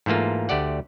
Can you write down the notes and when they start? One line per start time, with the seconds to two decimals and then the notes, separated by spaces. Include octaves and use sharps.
0.06 G#2 E3 A3 A#3 F4
0.49 D2 A3 G4 D5 F#5